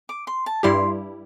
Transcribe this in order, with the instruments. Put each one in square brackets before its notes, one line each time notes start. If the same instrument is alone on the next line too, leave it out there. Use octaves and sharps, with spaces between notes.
[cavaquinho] D6
C6
A5
[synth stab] G2 G3 E4 G4 [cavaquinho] C6